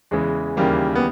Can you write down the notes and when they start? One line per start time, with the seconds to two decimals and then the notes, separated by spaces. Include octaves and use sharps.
0.11 E2 C#3 E3 G#3
0.57 D#2 C#3 E3 G3 A#3
0.95 B3